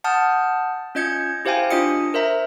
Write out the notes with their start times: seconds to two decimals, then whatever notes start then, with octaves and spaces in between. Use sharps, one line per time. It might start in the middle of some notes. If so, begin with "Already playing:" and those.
0.04 F#5 A5 D#6 F6 G6
0.95 C#4 F4 D#5 G6 G#6 C#7
1.45 E4 G4 C5 F5 G5 G#5
1.71 D4 F4 D#5 D#6 C#7
2.14 A#4 C5 E5 A#5